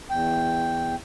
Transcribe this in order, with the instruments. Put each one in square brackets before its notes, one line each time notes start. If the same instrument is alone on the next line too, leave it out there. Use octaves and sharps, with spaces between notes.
[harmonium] E2 G5